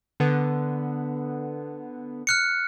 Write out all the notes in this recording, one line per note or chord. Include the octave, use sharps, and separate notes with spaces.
D3 B3
F6 F#6 C#7